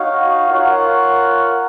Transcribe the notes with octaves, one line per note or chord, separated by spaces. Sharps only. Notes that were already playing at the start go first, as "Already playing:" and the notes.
Already playing: D#4 F#4 C#5 F5
F4 A#4 C#5 F#5